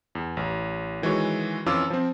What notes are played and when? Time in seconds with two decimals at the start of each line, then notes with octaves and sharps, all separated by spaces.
0.15 E2
0.37 A1
1.02 D#3 E3 G#3 F#4 C#5
1.66 F2 E3 C#4 F4 D6 E6
1.90 F3 C4